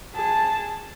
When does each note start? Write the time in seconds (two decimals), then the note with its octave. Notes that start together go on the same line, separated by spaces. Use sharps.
0.14 G#4 A5